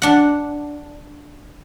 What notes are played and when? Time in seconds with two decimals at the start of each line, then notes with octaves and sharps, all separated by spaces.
0.02 D4 F#5